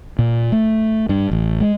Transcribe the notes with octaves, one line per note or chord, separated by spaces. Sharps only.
A#2
A3
G2
A1
G#3